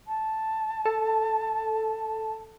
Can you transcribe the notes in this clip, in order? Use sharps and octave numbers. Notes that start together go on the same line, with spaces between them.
A5
A4